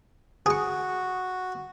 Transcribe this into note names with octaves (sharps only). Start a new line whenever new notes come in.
F#4 G#4 C#6